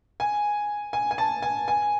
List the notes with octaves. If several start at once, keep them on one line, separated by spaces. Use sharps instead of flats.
G#5
G#5
G#5
A5
G#5
G#5